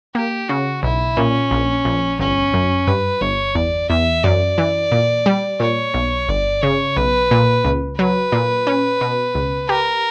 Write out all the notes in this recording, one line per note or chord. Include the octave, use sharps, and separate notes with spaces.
A#3 G4
C#3 F#4
B1 E4
A#2 C#4
A#1
A#1
G1 C#4
F#2
G2 B4
G1 C#5
E2 D5
E2 E5
F#2 D5
E3
A#2
G3
A#2 C#5
B1
G1 D5
C#3 C#5
B1 B4
A#2
C#2
F#3 B4
A#2
C#4
B2
C#2
G4 A#4